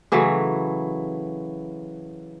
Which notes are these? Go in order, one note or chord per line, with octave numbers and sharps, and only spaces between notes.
C#3 E3 F#3 A3